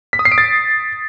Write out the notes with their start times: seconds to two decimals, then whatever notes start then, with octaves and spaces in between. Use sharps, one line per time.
0.13 B6
0.19 D#6
0.25 C7
0.32 D7
0.38 A6